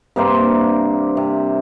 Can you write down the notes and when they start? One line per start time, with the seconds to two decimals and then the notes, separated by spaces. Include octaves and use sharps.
0.16 G2 C3 A#3 C5
1.17 C3